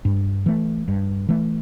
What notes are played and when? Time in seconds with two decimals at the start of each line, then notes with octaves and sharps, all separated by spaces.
0.05 G2
0.46 E3 A3
0.88 G2
1.29 E3 A3